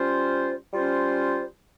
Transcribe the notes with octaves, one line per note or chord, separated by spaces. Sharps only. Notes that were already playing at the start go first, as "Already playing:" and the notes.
Already playing: G3 C#4 F4 C5
G3 C#4 F4 C5